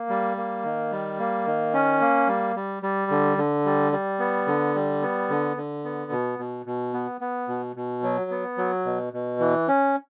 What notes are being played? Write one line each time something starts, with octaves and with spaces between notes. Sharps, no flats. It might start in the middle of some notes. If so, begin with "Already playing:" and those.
Already playing: A#3
G3
A#3
D#3
G3
A#3
D#3
C#4
A#3
G3
G3
G3
D3
D3
G3
G3
B3
D3
G3
B3
D3
D3
B3
B2
B2
B2
B3
B3
B2
B2
F#3
B3
F#3
B2
B2
E3
C#4